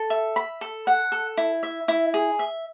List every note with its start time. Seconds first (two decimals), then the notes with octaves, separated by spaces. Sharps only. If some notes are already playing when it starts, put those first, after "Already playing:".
Already playing: A4
0.10 E5
0.36 B5
0.61 A4
0.87 F#5
1.12 A4
1.37 E4
1.63 E5
1.88 E4
2.14 G#4
2.39 E5